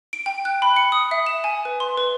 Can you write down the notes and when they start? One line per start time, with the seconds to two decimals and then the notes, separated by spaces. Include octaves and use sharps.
0.13 D7
0.26 G5
0.45 F#6
0.62 B5
0.76 C#7
0.92 D#6
1.11 E5
1.26 E7
1.44 G#5
1.65 B4
1.80 C6
1.97 B4